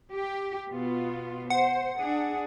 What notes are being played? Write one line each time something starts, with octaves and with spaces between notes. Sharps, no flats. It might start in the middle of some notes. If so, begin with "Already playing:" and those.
G4
B2 B3 F4
C5 F#5
D4 G#4